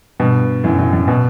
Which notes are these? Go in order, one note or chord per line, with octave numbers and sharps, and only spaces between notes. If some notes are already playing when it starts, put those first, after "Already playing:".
G2 B2
F#2 A2
F#2 A2
F#2
B2